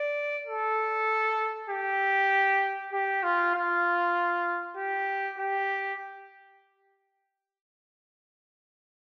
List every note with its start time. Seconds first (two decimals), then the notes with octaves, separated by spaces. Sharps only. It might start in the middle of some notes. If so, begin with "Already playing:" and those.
Already playing: D5
0.47 A4
1.69 G4
2.93 G4
3.23 F4
3.55 F4
4.77 G4
5.38 G4